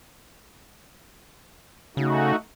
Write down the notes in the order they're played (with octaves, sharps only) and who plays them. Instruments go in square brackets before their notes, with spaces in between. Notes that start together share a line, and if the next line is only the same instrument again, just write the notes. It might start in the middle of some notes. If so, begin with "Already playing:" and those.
[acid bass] C#3 [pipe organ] A3 D#4 F#4